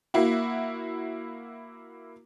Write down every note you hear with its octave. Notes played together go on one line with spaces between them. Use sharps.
A#3 E4 F#4